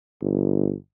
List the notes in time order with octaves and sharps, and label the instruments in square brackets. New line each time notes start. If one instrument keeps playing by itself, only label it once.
[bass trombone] G1